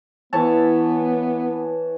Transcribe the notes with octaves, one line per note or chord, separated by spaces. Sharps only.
E3 B3 C#5 A5